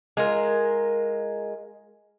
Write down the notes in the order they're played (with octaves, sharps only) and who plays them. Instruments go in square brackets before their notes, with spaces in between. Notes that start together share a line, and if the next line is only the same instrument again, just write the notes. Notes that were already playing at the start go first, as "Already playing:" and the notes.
[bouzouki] G#3 F4 A#4